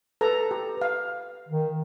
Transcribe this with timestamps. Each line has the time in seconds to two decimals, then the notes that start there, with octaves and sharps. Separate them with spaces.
0.21 A4 B4 A#5
0.51 G4
0.77 B4 F5
1.49 D#3